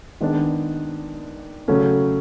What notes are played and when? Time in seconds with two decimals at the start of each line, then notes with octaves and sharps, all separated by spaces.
0.21 D#3 G#3 B3 D4
1.68 C#3 F#3 A3 C#4